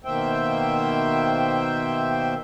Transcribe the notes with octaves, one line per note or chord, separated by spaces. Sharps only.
B2 D#3 A#3 C5 E5 G5